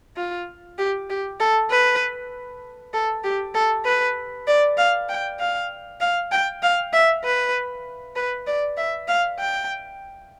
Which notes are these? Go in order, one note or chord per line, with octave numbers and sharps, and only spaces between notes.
F4
G4
G4
A4
B4
A4
G4
A4
B4
D5
F5
G5
F5
F5
G5
F5
E5
B4
B4
D5
E5
F5
G5